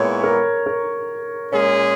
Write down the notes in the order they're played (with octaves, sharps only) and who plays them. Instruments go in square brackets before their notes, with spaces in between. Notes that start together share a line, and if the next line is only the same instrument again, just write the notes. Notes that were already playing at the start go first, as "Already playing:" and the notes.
Already playing: [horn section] A#2 G#3 B3 E4 [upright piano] C#5
[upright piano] A#4
A#4
[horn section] A#2 G#3 C#4 G#4